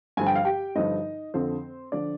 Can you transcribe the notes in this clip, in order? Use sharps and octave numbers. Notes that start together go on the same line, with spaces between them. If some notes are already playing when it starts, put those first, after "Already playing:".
G2 D3 F3 G#5
G5
F5
G4 G5
G2 D3 F3 D#4 D#5
F2 D3 F3 C4 C5
D3 F3 D4 D5